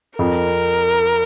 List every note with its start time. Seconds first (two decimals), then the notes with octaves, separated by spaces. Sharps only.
0.19 F2 A#4